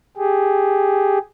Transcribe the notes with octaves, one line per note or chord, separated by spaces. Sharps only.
G4 G#4